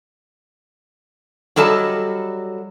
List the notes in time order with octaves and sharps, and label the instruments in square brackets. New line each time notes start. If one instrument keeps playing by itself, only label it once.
[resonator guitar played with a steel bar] F#3 G3 A4 D#5 A5